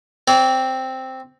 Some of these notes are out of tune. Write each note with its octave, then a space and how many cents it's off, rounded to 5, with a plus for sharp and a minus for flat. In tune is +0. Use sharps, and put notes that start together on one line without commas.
C4 +0 D5 -40